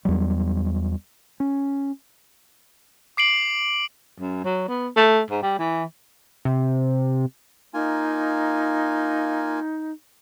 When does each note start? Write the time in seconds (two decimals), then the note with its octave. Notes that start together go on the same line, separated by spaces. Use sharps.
0.05 E2 F#3 G3
1.40 C#4
3.17 D6 C7 D7 F#7
4.19 F#2
4.45 F#3
4.68 B3
4.97 A3
5.31 G#2
5.43 G3
5.59 E3
6.45 C3
7.74 A#3 D#4 F4 G#5